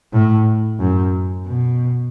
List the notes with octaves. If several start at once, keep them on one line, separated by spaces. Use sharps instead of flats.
A2
F#2
B2